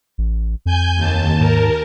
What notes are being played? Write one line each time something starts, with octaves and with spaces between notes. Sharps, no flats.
A1
F2 G#5 G6
D#2 A5
G#2 A#4